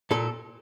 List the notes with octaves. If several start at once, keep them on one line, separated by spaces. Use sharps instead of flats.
A#2 A4